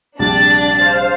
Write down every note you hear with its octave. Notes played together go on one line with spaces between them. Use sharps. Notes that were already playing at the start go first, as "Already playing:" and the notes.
A#1 C3 G3 D4 A6
C5 F5